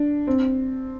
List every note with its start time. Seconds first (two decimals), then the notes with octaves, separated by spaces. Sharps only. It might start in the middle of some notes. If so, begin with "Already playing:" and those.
Already playing: D4
0.27 C4